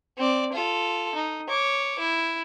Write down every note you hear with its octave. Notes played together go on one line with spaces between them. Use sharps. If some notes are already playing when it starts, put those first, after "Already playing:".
C4 D5
F4 A4
D#4
C#5 D6
E4